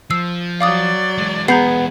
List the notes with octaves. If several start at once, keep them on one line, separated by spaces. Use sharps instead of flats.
F3 E6 C7
F#3 D5 F5 D6 D#6
E3 G#3
B3 G#4 A#5 G6 C7